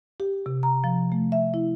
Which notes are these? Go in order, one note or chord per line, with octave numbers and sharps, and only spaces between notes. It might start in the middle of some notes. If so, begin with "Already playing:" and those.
G4
C3
A#5
F3
A3
E5
E4